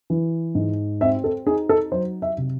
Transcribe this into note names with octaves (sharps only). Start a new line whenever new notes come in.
E3
G#2
C4 E5
A4
D#4 G#4
A4
F#3 C5
E5
C3